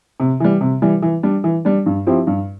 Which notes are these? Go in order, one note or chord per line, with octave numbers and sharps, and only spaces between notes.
C3
E3 G3
C3
E3 G3
E3
G3 D4
E3
G3 D4
G2
F3 C4 E4 G4
G2